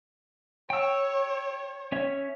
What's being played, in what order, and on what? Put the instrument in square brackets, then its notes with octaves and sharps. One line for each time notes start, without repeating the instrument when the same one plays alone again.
[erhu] C#5 [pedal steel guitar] G5 E6
[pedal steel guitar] C#4 C#5 E5